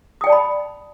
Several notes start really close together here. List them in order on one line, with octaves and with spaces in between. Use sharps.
D#6 G5 D5 A5 B5